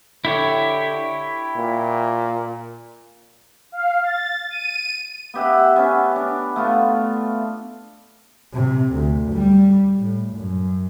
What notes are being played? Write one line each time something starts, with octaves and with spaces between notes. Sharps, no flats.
D3 E4 G4 C#5
A#2
F5
A6
D#7
B3 G4 E5 F#5
B3 C#4 B4
D4
A3 B3 F4
C3
D2
G3
A2
F#2